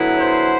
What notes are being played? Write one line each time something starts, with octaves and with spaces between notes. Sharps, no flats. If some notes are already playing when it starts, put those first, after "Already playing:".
Already playing: D3 F#3 B3 E4
C5